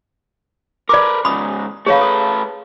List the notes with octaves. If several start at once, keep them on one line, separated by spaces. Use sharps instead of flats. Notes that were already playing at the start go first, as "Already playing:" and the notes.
A#4 B4 D5 D6
G#2 C#3 B5 D#6
A3 G#4 B4 C#5 F5
A4